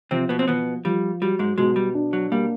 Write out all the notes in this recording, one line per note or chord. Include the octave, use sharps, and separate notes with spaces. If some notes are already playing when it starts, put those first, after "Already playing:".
C3 F3 C4
B2 B3
C4
B2 F3 B3
F3 G3
F#3 G3
G#2 G#3
G#2 B2 G#3
G3
D4
F#3
G3 A#3